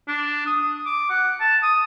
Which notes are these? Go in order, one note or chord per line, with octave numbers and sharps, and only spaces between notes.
D4
D#6
D6
F#5
A5
D#6